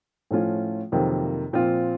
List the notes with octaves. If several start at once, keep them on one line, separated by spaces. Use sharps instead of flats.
A2 F3 A3 C#4 F4
F2 C3 D#3 F#3 A#3
A#2 F3 C4 F4